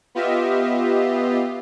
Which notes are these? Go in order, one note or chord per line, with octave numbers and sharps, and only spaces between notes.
B3 F4 G4 D#5 E5